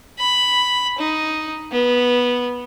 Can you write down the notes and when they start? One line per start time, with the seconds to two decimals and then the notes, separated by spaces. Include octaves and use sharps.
0.19 B5
0.99 D#4
1.72 B3